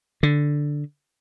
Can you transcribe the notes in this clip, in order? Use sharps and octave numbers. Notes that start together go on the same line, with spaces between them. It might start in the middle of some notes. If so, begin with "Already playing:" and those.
D3